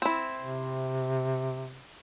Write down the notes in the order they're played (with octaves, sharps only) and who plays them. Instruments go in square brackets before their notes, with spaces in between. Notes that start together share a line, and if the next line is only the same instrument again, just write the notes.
[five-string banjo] C4 E4
[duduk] C3